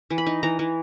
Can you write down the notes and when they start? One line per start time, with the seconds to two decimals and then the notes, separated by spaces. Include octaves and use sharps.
0.10 E3
0.18 B5
0.27 D#4
0.43 E3 A#5
0.59 E3